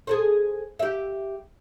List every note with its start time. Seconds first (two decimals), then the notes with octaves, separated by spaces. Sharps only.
0.07 G#4 A4 C5
0.79 G4 E5